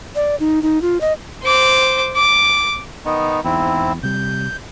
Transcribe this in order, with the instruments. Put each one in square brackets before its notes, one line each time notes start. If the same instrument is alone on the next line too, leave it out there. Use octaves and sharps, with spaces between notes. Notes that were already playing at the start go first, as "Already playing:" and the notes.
[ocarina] D5
D#4
D#4
F4
D#5
[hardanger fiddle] C5 D6
D6
[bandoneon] D#3 B3 D#4
[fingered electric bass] E2 [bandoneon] G#2 C4 E4
[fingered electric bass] C3 G3 [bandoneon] G6